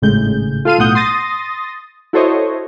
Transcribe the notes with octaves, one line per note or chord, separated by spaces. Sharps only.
G#1 A2 C#3 G#3 G6
F4 A4 F5 C6 D#7
B1 A2 F#5 D#6 G6
C6 D#6 A6 A#6
E4 F#4 A4 C5 C#5 D#5